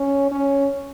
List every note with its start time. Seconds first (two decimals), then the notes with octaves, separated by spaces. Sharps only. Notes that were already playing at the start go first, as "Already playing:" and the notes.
Already playing: C#4
0.31 C#4